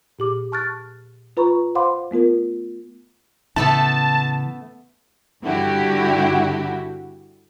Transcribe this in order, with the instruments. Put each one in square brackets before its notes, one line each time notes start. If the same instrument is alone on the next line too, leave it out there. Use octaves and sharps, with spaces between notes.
[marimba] A#2 G4 D6
A5 C#6 F6 F#6 A6
F4 B4 A#5 B5 C#6
C5 F5 F#5 B5 C6 D6
A3 B3 F4 A#4
[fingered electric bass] A2 C#3 E3 [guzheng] A3 B3 A4 [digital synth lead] A5
[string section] G2 D3 E4 F#4 G4